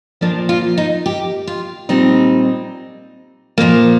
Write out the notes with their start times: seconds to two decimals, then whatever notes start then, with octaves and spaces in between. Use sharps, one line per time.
0.21 A#2 F3 A#3 D4
0.49 F4
0.77 D#4
1.06 G4
1.47 F4
1.89 A#2 G3 C4 D#4
3.58 A#2 F3 A#3